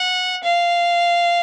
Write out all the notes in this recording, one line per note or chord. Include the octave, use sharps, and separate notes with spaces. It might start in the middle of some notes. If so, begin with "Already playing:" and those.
Already playing: F#5
F5